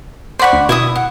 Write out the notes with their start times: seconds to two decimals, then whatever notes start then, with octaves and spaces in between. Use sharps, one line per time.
0.39 C5 D5 F#5 B5 C#6
0.53 D2
0.69 B2 E4 E5 D#6
0.95 F#5